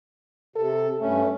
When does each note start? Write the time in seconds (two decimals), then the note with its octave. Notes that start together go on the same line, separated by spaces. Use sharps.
0.56 C3 A4
1.01 G2 A3 C#4